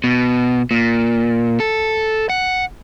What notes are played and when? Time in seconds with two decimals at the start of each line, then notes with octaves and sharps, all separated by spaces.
0.04 B2
0.71 A#2
1.60 A4
2.30 F#5